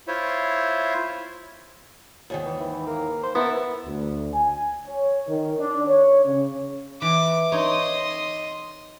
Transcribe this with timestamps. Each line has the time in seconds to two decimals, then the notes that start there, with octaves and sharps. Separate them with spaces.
0.08 E4 F4 C5 C#5 E5
2.30 D#2 G#2 D#3
2.44 E3
2.60 E3
2.87 A#3
3.23 C5
3.35 B3 E4 A4 A#4
3.86 D2
4.34 G#5
4.87 C#5
5.28 D#3
5.60 D4
5.88 C#5
6.25 C#3
7.02 E3 D6
7.52 D#4 C#5 D#5 C6